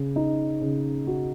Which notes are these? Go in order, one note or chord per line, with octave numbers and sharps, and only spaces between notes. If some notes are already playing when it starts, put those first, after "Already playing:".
Already playing: C#3
D#4
C#3
F#4